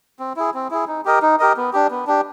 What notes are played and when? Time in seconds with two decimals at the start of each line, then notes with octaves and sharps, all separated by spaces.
0.19 C4
0.36 E4 G#4
0.54 C4
0.71 E4 G#4
0.87 D#4
1.05 G4 A#4 D#5
1.22 D#4
1.40 G4 A#4 D#5
1.57 B3
1.73 D4 G4
1.91 B3
2.07 D4 G4